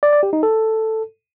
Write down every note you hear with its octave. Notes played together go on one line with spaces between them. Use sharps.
D5
D5
G4
D#4
A4